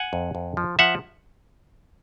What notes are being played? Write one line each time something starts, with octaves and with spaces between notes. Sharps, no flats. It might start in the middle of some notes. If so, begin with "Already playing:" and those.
Already playing: F#5 G#5
F2
F2
F3
F3 E5 F#5